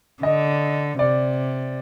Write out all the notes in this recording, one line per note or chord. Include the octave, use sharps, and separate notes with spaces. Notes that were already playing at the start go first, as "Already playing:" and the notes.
D3 D#5
C3 D5